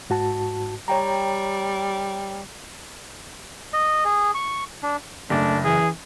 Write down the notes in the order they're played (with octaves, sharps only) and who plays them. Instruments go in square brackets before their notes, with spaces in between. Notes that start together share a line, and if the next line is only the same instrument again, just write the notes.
[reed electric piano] G#2 F#4 A5
[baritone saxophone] G3 [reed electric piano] C#5 G5 A#5
[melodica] D#5
G#4
C#6
D4
[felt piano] F#1 [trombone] A3 [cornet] D4
[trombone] E3 [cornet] G#4